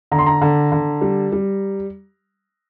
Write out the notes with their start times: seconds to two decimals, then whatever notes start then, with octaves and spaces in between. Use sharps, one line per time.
0.12 D3 A#5
0.18 C6
0.26 A#5
0.41 D3
0.72 D3
1.01 G3
1.32 G3